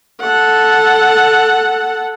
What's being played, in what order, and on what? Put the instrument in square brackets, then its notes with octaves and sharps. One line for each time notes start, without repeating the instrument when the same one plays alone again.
[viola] A4 F#5